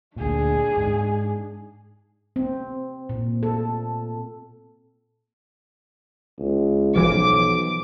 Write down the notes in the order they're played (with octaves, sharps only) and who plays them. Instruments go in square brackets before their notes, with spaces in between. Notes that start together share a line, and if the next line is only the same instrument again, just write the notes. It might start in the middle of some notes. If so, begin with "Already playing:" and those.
[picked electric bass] D2 A#2 [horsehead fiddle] D4 G#4
[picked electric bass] G#2
[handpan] C4
A#2
A4
[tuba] C#2
[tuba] B1 [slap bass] E3 F3 [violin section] D6